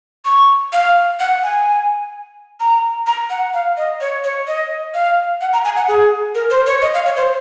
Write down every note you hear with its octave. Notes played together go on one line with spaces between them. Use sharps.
C#6
F5
F#5
G#5
A#5
A#5
F#5
F5
D#5
C#5
C#5
D#5
F5
F#5
A#5
G#5
F#5
G#4
A#4
C5
C#5
D#5
F5
C#5
C5